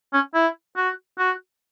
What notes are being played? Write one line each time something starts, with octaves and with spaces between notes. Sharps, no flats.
C#4
E4
F#4
F#4